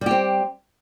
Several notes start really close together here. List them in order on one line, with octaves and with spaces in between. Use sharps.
G3 G4 C4